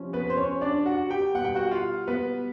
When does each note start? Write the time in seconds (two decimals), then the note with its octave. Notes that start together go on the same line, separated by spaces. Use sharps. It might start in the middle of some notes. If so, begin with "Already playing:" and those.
Already playing: C3 F3 C#4
0.13 B3 B4
0.30 C5
0.37 C#4 C#5
0.61 D4 D5
0.86 F#4 F#5
1.10 G4 G5
1.34 B2 G3 B3 F#5
1.45 G5
1.55 F#4 F#5
1.71 F4 F5
2.07 B3 B4